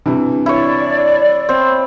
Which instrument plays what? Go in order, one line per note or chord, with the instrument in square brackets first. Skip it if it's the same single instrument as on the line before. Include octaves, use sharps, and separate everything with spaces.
[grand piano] G2 C3 E3
[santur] E4 C#5 [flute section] D5
[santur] C4